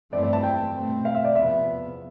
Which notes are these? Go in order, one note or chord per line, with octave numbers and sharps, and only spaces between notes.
G2 E3 A3 C4 D5
D5
A5
G5
B2 A3 C4
F5
E5
D5
E2 C3 F3 B3 E5